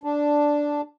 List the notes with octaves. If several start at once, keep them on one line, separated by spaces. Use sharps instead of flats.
D4